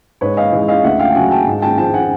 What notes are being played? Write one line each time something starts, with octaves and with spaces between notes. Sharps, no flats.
G#2 B4 C#5
D#5 F5
E3 G#3
D#5 F5
D2 E5 F#5
F5 G5
G5
C#3 F#3 F#5 G#5
G5 A5
G#2
G5 A5
F3 G#3 G5 A5
F#5 G#5